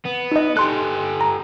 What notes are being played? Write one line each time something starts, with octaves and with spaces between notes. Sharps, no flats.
B3
D#4 D#5
G4 A4 C6 F#6
A#5